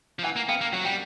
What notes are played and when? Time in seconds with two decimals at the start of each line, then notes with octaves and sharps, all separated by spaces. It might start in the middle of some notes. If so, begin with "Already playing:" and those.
0.19 F3
0.24 E3 F#5 G#5
0.36 A#3
0.48 B3 F5 G5
0.61 A#3
0.73 F#3 F#5
0.84 G3 G5